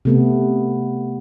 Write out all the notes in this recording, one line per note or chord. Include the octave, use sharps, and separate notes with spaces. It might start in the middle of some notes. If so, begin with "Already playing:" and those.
C3 A3 B3